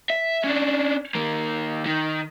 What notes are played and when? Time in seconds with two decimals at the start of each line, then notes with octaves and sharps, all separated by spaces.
0.10 E5
0.44 C#4 D4
1.15 D#2 A#3
1.86 D#3